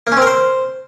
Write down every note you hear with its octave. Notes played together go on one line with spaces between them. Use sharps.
A#3
C#4
C4
A#4
C5